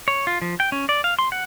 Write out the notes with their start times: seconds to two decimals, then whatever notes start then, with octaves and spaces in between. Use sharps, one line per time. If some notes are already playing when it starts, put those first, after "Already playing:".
0.08 C#5
0.27 F4
0.42 F3
0.60 G5
0.72 C#4
0.89 D5
1.04 F5
1.19 C6
1.32 F#5